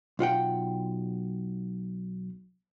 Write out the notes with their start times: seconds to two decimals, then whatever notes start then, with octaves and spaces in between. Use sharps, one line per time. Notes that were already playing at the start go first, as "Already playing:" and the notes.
0.19 B1 F4 F#5 G5